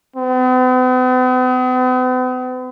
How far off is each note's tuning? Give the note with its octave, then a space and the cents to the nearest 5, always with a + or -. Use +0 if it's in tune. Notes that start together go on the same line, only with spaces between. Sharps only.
B3 +45